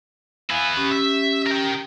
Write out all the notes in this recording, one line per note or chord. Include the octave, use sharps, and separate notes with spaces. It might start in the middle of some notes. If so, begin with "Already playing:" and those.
B3 E4 F5 G#5
C#4 G4
E5
A#4 G5